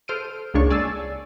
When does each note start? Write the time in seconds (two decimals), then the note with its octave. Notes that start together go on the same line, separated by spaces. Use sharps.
0.08 A4 C5 F6 D7 D#7
0.54 C#2 G#3 A#3 D4 C#5 C#6
0.70 D5 G#5 A5 E6 A6 C7